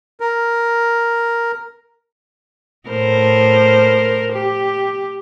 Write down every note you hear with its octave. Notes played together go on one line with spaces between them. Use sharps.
A#4
A2 A#4 C5
G4